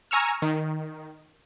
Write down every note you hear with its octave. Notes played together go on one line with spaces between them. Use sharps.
G#5 A#5 C#6 E6 F6
D#3